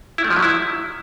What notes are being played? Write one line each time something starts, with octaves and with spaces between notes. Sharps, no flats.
E4
A3
F3
F#3
E4